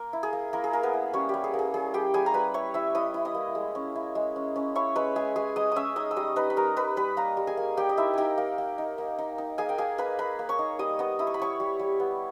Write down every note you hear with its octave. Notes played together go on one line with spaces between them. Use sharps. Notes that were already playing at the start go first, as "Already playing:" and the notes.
Already playing: A#3 A#4
E4
G#4
A#3
A#3 E4 A#4
G#4
A#3 A#4
B3 B4
E4
G3 C#4 C#5
G3 G4
G#4
A#3
G#4
G3 G#4
G3 G4 G5
G3 G#4 G#5
A#5
G3 B4 B5
E4 C#5 C#6
E4 E5 E6
E4 D#5 D#6
E4
D#5 D#6
A#3
G#3
C#4
E4
G#3
C#4
C#4
E4 C#5 C#6
G#3 B4 B5
G#3 G#4 G#5
G#3 G#4 G#5
G#3 D#5 D#6
C#4 E5 D#6 E6
D#4 D#5 D#6
E6
G3 D#5 D#6
D#4 B4 B5
B5
G3 A#4 A#5
D#4 B4 B5
G3 B4 B5
A#3 A#4 A#5
G3
G#4 G#5
A#3
A#3 G4 G5
D#5
D#4 E4 E5
D#4 G4 G5 G#5
A#3
A#3
D#4
A#3
D#4
D#4
A#3 G#4 G#5
G5
A#3 G#4 G#5
A#3 B4 B5
A#3 B4 B5
A#3
C#5 C#6
D#4
G3 D#5 D#6
B3 D#5 D#6
E4 D#6
C#6
B5
E4 C#5 C#6
G3
G3
B3